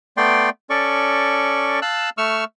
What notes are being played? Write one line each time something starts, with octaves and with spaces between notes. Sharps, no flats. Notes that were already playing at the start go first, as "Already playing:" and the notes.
A3 B3 D5 G5 C6
C#4 A4 D5 C#6
F5 A5 E6 F#6
A3 C#6 E6 F6